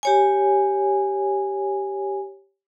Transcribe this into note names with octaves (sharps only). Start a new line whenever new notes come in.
G4 C#5 G#5